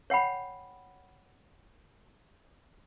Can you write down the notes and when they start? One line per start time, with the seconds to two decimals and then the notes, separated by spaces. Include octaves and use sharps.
0.10 C#5 F#5 G5 B5